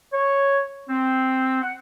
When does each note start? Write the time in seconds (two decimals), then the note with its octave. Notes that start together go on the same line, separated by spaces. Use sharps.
0.12 C#5
0.89 C4
1.62 F#5